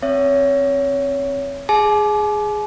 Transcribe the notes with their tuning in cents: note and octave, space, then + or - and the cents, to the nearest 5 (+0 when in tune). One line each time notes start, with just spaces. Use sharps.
C4 +15 C#5 +20 E5 +15
G#4 +0 G#5 +45